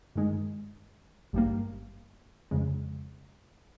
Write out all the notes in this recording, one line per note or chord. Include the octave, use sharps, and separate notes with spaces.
G2 D#3 G#3
G#1 G2 G3 A#3
F2 C#3 G#3